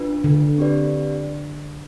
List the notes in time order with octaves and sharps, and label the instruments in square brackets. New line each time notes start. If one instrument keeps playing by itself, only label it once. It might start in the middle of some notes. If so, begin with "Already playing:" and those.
Already playing: [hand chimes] D4 F4 B4
[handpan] D3
[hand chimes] C4 G4 B4 D5